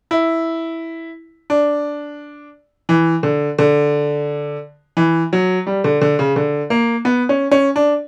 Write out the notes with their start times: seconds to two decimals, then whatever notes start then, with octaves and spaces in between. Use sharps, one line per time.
0.11 E4
1.50 D4
2.89 E3
3.23 D3
3.58 D3
4.97 E3
5.33 F#3
5.67 G3
5.84 D3
6.01 D3
6.19 C#3
6.36 D3
6.70 A#3
7.05 B3
7.29 C#4
7.51 C#4
7.76 D4